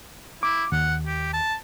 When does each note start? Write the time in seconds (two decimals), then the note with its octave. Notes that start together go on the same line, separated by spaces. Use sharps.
0.43 E4 D6
0.72 D#2 F#5
1.06 G4
1.33 A5